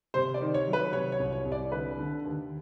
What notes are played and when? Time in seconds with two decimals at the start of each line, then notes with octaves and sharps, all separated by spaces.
0.14 C3 C5
0.34 D5
0.41 D#3
0.54 C#5
0.67 F#3
0.73 B4
0.92 C3 C#5
1.12 C#5
1.19 C2
1.33 C#5
1.45 C2
1.52 D5
1.72 D3 B4
1.98 D3
2.24 D#2